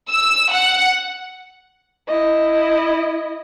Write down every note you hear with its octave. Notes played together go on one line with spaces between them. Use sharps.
E6
F#5
E4 D#5